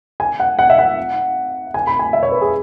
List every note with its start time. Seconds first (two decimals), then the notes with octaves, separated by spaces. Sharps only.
0.20 G#5
0.40 F#5
0.59 F#5
0.70 E5
0.79 F#5
1.74 G#5
1.87 B5
1.99 G#5
2.13 E5
2.23 C#5
2.32 B4
2.42 G#4